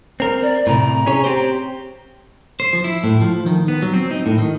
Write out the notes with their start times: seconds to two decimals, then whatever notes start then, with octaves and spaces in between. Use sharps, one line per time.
0.20 C4 A#4
0.42 D5
0.67 A2 C3 A#5
1.06 C#4 G#4 C#5
1.24 C4 G4 C5
2.60 C5
2.73 F3
2.84 E4
3.04 A2
3.21 F3
3.46 D#3
3.68 B3
3.82 F#3
3.94 C4
4.11 D#4
4.26 A2
4.38 D#3